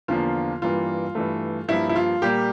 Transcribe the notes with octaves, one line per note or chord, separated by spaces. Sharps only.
E2 D3 F3 A#3 F4
G2 E3 G3 A#3 F4
G2 E3 A3
G2 F3 A#3 E4
E4
F4
A#2 G3 A#3 G4